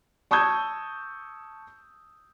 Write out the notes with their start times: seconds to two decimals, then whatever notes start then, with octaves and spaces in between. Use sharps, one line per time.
0.31 A5 C#6 D#6 E6 G6 G#6